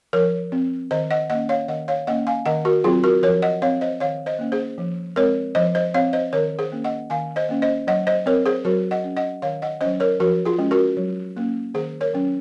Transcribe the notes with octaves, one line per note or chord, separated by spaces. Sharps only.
F3 A#4 C#5
C4
D#3 C5 D#5
D#5 F#5
A#3 C#4 D#5 F#5
C#5 F5
D#3 D#5 F#5
C#5 F5
A#3 C#4 D#5 F#5
F5 G#5
D#3 D#5 F#5
F#4 A#4
F#3 C4 F4 G#4
F#4 A#4
F3 A#4 C#5
D#5 F#5
C4 C#5 F5
C5 D#5
D#3 C#5 F5
C5 D#5
A#3 C#4
G#4 C5
F3
G#3 C4 A#4 C#5
F3 C5 D#5
C5 D#5
C4 C#5 F5
C5 D#5
D#3 A#4 C#5
G#4 C5
A#3 C#4
D#5 F#5
D#3 F5 G#5
C5 D#5
A#3 C#4
C5 D#5
F#3 D#5 F#5
C5 D#5
C4 A#4 C#5
G#4 C5
F#3 F#4 A#4
D#5 F#5
C#4
D#5 F#5
D#3 C#5 F5
D#5 F#5
F#3 C#4 C5 D#5
A#4 C#5
F3 F#4 A#4
F4 G#4
G#3 C#4
F#4 A#4
F#3
A#3 C#4
D#3 G#4 C5
A#4 C#5
F#3 C#4